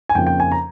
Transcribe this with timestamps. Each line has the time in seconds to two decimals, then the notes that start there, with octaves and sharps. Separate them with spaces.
0.09 G#5
0.15 F2 C#3 F3 A#3 D#4 G5
0.27 G5
0.40 G#5
0.52 A#5